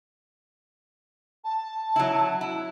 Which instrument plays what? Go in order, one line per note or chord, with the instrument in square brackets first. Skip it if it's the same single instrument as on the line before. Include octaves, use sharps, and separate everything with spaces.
[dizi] A5
[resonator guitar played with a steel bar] F#3 E4
E4